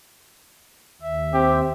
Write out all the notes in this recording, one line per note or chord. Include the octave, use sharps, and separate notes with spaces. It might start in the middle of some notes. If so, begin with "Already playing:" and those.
D#2 E5
C4 G4